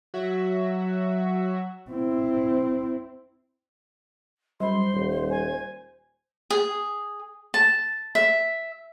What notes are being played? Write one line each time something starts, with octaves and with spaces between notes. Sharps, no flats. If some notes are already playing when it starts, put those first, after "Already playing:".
F#3 F#4 E5
C4 E4
F#2 G3 C5 B5 C6
D#1
G#5
G#4
A5
E5